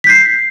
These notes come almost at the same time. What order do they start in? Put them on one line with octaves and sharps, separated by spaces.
B6 G6 C7